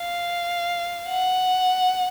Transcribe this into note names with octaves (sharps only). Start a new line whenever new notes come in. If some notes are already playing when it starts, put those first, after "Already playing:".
Already playing: F5
F#5